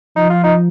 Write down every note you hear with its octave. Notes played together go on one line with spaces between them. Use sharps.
F3 D#4
F4
D#4